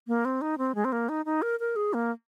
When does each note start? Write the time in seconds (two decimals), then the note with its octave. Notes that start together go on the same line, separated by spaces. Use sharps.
0.08 A#3
0.25 C4
0.41 D#4
0.58 C4
0.75 G#3
0.85 C4
0.92 A#3
1.09 D#4
1.25 D#4
1.42 A#4
1.60 A#4
1.76 G#4
1.94 A#3